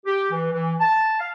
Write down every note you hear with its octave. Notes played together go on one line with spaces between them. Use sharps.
G4
E3
E3
A5
F5